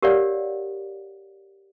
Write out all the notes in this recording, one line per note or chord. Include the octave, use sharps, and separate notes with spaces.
G4 A#4 C#5 D5 F5 F#5